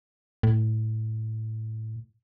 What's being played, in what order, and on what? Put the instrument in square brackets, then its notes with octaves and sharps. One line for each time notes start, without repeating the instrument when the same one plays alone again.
[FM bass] A2